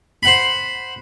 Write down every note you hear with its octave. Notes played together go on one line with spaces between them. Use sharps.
C5 F#5 B5